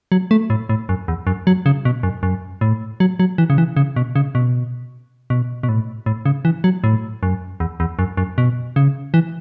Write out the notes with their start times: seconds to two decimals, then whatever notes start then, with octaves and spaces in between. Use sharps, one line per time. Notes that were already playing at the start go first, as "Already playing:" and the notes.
0.12 F#3
0.31 A3
0.50 A2
0.69 A2
0.89 F#2
1.08 E2
1.27 F#2
1.47 F#3
1.66 C#3
1.85 B2
2.03 F#2
2.23 F#2
2.61 A2
3.00 F#3
3.20 F#3
3.38 E3
3.50 C#3
3.58 E3
3.77 C#3
3.96 B2
4.16 C#3
4.35 B2
5.30 B2
5.63 B2
5.69 A2
6.06 A2
6.26 C#3
6.45 E3
6.64 F#3
6.84 A2
7.23 F#2
7.60 E2
7.80 E2
7.99 F#2
8.17 F#2
8.38 B2
8.76 C#3
9.14 E3